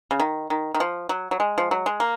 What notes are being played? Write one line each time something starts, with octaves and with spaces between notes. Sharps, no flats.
C#3
D#3
D#3
D#3
F3
F#3
F#3
G#3
F3
F#3
G#3
A#3